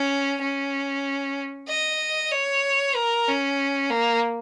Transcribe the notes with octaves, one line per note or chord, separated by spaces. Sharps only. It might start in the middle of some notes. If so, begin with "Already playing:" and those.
Already playing: C#4
C#4
D#5
C#5
A#4
C#4
A#3